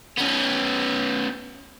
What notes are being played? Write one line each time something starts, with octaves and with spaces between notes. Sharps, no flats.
B3 C#4